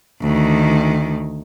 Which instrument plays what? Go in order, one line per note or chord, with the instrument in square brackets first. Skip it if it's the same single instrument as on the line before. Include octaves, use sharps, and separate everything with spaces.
[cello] D2 D#3